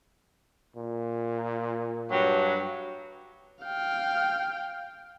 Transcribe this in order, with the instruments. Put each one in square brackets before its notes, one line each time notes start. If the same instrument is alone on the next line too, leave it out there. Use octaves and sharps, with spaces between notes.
[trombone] A#2
[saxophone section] G2 F#3
[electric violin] F5 G5